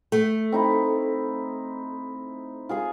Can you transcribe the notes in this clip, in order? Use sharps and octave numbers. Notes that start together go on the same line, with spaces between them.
A3
C4 D#4 E4
F4 G#4 G#5